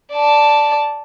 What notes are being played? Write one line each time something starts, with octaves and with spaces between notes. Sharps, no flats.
D5 A5